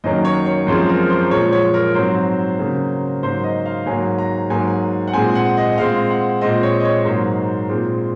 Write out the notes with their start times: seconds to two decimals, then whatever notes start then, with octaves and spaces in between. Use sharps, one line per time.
0.04 F#2 D#3 F#3 A#3 D#5
0.25 C#5
0.46 C#5
0.67 F#2 F3 G#3 C4 C5
0.89 A#4
1.10 C5
1.31 A#2 F3 G#3 C#5
1.52 C#5
1.74 A#4
1.95 G#2 F#3 C4 C5
2.59 C#3 F#3 A#3
3.23 G#2 F#3 A#3 C5
3.44 D#5
3.66 F5
3.86 G#2 F#3 A#3 G#5
4.18 A#5
4.50 G#2 F#3 A#3 G#5
5.08 F#5
5.13 A#2 G#3 C4 G#5
5.35 F#5
5.57 D#5
5.72 D#5
5.78 A#2 G#3 C4 F5
6.10 F#5
6.41 A#2 G#3 C4 D#5
6.63 C#5
6.80 D#5
6.85 C#5
7.05 G#2 F#3 A#3 C5
7.69 A#2 G#3 C4